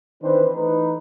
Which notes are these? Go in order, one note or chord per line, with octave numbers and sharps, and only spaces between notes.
D#3 E3 C4 D4 B4 C5
E3 A3 D#4 B4